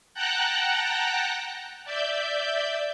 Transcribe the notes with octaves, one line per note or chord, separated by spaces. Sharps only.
F#5 G5 A5 A#5 F#6
D5 E5 G6